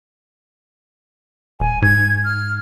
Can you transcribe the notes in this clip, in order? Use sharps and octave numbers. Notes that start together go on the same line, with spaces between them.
D#1 G#5
G#2 G#6
F6